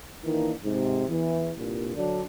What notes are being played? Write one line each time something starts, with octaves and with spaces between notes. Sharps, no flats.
D#3 E3 A#3 D4 D#4
G#2 C3
E2 E3
C2 G2 A#2
D3 F#3 D4